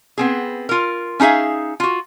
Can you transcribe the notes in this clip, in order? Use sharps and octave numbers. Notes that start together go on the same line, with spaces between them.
B3 C4 G#4
F4 A#4
C#4 D#4 G#4 E5 F5
F4 F#4